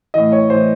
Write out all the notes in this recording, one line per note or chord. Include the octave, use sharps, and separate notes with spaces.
A2 E3 D#5
C#5
A2 E3 C5